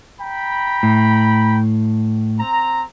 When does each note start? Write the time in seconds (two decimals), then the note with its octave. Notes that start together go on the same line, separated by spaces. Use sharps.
0.21 G5 A#5 B5
0.83 A2
2.40 C4 A#5